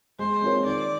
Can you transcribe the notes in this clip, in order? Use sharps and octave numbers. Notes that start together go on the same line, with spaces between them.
G#3 C5
C4 F4 A#4 C#5
D#3 D5